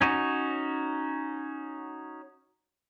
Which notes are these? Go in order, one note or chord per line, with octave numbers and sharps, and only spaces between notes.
C#4 D#4 F#4